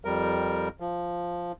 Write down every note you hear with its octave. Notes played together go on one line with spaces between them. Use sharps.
F2 G3 A#4
F3